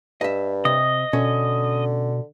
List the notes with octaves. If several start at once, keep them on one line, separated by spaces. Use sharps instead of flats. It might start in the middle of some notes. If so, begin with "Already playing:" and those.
G2 D#5 E5
C3 D#5
B2 D3 C#4